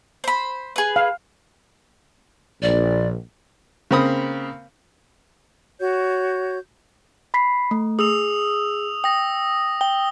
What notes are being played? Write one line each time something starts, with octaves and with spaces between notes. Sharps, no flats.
C5 B5
G#4 B4
F5
A#1 D5
C#3 A#3 C4 B5 D#6
F#4 C#5 G6
B5 B6 C7
A3
G#4 D#6 E6 F7
G5 D#6 A#6
G5 G7